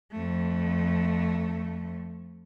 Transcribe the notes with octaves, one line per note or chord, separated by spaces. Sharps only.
F2 A3